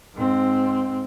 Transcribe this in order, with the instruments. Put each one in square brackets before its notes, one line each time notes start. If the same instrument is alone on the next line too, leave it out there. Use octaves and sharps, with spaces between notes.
[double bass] G#2 C4